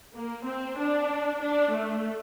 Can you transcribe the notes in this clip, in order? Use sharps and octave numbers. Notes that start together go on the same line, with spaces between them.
A#3
C4
D4
D4
A3